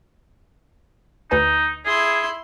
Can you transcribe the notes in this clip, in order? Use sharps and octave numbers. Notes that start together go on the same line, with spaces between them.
D2 D#4 B4 G#5
E4 G#4 C6